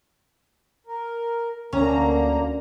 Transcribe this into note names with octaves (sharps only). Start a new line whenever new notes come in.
A#4
D2 D3 A#3 C#4 A#5